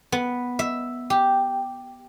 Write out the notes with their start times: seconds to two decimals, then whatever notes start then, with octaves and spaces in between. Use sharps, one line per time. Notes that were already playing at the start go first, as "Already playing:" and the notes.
0.12 B3
0.59 E5
1.10 G4